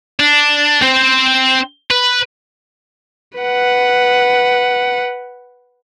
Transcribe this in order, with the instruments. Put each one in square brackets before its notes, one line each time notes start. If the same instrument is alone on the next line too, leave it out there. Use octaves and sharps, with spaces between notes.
[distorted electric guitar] D4
C4 C5
B4
[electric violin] B4 F#5